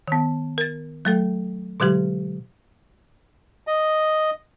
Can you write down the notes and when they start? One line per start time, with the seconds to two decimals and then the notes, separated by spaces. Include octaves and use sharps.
0.08 D#3 B3
0.58 A#4 A6
1.05 F#3 A3 A4
1.80 B2 D3 F#3 G#3 G4
3.67 D#5